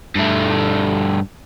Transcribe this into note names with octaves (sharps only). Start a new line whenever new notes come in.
G2 A3